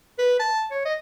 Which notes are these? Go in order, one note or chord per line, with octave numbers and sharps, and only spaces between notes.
B4
A5
C#5
D#5